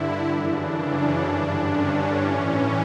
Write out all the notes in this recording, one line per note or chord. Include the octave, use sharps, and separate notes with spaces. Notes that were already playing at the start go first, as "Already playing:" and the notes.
Already playing: G2 D3 E4
F#2 C#3 E3 D4
C#4
G2 D3 D4
C#4
A2 E3 C#4